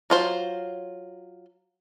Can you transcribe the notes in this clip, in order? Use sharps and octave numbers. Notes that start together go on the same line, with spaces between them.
F#3 F4 C5